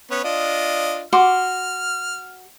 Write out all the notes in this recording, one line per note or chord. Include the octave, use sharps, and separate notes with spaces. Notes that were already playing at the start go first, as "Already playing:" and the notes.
B3 C#4
D4 F4 D#5
F#4 C6 D6 F6